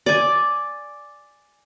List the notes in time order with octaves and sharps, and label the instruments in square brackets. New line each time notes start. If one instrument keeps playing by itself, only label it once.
[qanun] D5 G#5